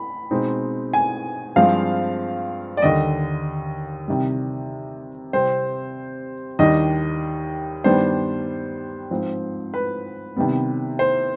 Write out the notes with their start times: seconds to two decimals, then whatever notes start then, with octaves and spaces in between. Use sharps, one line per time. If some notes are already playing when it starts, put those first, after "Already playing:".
Already playing: B5
0.31 B2 G#3 C4 D#4
0.94 G#5
1.56 G2 F3 G#3 C4 F5
2.77 D5
2.82 D#2 D3 G3 D#5
4.08 C3 D#3 G3
5.33 C3 G3 C4 C5
6.59 D#2 D#3 G3 D4 D#5
7.84 G2 D#3 G3 B3 D4 C5
9.11 G#2 F3 C4
9.74 B4
10.36 C3 D#3 G3 B3
10.99 C5